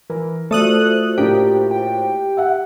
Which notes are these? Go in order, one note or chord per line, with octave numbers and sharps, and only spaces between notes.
E3 A#4
A3 F4 F#4 A4 C5 D5 D#6 F#6
A2 A#3 D4 G4
G5
E5 F#5